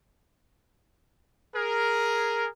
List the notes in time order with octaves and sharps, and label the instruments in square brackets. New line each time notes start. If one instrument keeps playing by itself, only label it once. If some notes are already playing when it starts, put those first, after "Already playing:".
[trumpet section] G#4 A#4